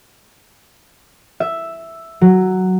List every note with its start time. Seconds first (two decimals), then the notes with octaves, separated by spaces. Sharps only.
1.40 E5
2.21 F#3